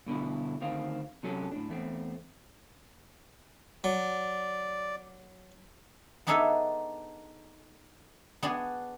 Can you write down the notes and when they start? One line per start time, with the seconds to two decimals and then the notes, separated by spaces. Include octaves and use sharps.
0.06 G2 B2 D3 E4
0.61 D2 D#3 C4 F5
1.23 C3 F#3 C#4 A4
1.52 A2 D4
1.69 E2 A3 C4
3.84 F#3 D5
6.27 B3 D4 D#4 G#4 A4 E5
8.43 B3 D4 F#4 G#4